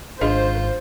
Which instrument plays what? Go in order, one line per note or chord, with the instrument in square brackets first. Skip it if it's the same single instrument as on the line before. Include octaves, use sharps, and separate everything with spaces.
[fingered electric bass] G#1 G#2 [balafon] D4 G#4 D#5 [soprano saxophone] F4 [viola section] C5